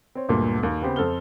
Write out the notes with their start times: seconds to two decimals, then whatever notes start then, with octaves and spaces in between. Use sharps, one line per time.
0.15 C4 C#5
0.29 D2 G2 A#2 G#3
0.63 D#2
0.82 C#3 B3 C4 G4 C5
0.96 F2 A4 C5 F6 G7